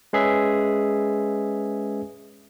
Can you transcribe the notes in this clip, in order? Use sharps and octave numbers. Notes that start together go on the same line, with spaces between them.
G#3 C#4 G#4 B4 E5